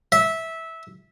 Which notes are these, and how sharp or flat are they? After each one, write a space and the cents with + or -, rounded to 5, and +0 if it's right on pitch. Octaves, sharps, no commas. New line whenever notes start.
E5 -15